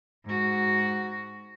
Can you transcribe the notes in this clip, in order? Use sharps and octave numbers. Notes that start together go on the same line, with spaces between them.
G#2 F#4